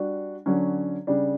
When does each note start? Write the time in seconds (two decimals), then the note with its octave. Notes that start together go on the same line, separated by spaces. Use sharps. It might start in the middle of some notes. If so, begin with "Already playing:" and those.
Already playing: G3 D4 F#4
0.46 D3 F#3 C#4
1.07 C#3 G3 D4